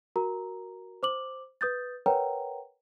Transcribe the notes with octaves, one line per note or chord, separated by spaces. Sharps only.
F#4 A#4 A#5
C5 D6 F#7
B4 D#6 G6 A6
A#4 B4 C#5 F#5 G5 A#5